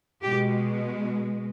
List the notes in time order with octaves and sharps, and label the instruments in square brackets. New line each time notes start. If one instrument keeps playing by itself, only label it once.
[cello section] B2 G#3 G4